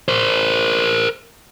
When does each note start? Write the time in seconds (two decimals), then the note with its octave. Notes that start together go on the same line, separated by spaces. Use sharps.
0.08 A#4 C5